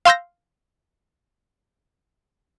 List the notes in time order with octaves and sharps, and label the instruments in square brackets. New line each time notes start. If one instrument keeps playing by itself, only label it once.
[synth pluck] F5 C6 E6 G6 A#6